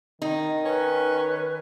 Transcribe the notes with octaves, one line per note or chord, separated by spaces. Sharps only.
D#3 D#4
C#4 B4